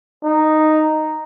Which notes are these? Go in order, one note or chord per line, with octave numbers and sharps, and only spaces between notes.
D#4